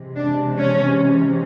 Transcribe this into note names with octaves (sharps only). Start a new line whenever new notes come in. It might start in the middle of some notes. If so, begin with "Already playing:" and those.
Already playing: C3 E3 G#3
D4
C#4